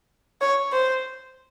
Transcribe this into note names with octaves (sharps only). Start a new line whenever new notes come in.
C#5
C5